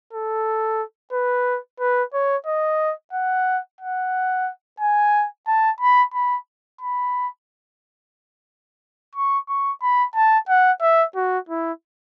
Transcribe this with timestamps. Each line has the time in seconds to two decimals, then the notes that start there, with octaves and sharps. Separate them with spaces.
0.13 A4
1.13 B4
1.80 B4
2.13 C#5
2.46 D#5
3.13 F#5
3.81 F#5
4.80 G#5
5.47 A5
5.81 B5
6.14 B5
6.81 B5
9.15 C#6
9.49 C#6
9.82 B5
10.15 A5
10.49 F#5
10.81 E5
11.15 F#4
11.49 E4